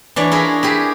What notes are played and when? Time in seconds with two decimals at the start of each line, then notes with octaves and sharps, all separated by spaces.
0.16 E3 D4 C#5 D5
0.32 E4 F4 G#4 A#4
0.63 E4 G4 G#4